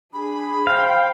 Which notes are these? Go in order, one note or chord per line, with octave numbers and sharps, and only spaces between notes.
D4 G#4 B5
C5 F5 G5